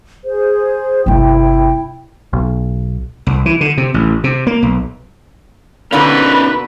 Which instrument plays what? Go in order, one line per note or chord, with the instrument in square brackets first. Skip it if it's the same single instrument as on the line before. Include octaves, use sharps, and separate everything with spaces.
[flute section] G#4 C5
[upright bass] G1 C3 [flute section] E4 G5
[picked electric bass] B1
[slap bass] C2
E3
D3
C3
A1
C3
A#3
B1
[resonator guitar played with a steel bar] B2 D3 A#3 [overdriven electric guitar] C#4 D#4 [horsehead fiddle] B4